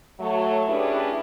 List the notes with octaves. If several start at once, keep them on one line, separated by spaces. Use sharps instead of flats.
F#3 A3
C#4 D4 E4 G4 G#4 B4